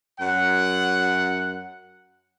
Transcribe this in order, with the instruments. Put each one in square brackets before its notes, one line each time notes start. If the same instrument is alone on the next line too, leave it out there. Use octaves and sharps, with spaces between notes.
[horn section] F#2 F#5